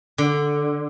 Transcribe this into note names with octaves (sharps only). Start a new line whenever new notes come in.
D3